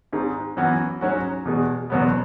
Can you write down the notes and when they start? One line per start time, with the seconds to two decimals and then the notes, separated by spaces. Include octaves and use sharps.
0.13 G#1 G#2 G#3
0.57 F#2 E3 B3 F#4
1.01 G#2 F#3 C#4 F#4
1.45 E2 B2 G#3
1.90 F#1 E2 B2 F#3 B3